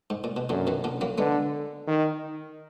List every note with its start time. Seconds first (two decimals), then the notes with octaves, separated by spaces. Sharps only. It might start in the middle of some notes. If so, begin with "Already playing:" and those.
0.10 G#2
0.24 A#2
0.36 B2
0.49 F#2 A#2 D3
0.67 B2 D#3
0.84 A#2 D3
1.01 F#3 A#3
1.18 D3 G#3 B3
1.87 D#3